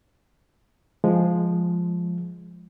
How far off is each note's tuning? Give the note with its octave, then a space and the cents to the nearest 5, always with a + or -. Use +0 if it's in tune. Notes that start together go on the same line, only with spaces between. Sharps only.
F3 +0 G#3 +0